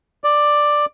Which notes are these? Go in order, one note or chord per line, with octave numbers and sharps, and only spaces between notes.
D5